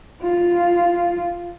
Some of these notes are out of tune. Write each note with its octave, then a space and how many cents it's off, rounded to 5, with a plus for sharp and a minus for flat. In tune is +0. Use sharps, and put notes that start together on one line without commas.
F4 -5